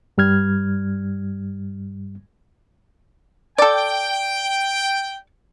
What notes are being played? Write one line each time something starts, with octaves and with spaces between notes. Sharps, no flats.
G2 G3 F6 G#6
A4 D5 G5